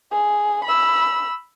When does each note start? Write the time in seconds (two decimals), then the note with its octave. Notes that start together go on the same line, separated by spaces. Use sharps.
0.12 G#4
0.65 B5 E6